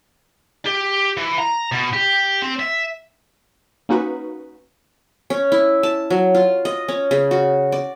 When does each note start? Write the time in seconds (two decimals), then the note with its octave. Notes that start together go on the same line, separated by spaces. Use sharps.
0.66 G4
1.17 E3
1.39 A#5
1.72 B2
1.93 G4
2.42 C4
2.59 E5
3.89 A#3 C#4 D#4 F#4 B4
5.30 C#4
5.52 E4
5.83 A5
6.10 F#3
6.35 F4
6.65 D#5
6.88 C#4
7.11 C#3
7.31 F#4
7.72 D5